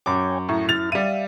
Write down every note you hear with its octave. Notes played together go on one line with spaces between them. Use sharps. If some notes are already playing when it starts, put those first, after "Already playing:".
F#2 C#5 G5 G#5 D6
A2 A#5 C#6
E4 F6 A6 F7
G3 E5 F5 D#7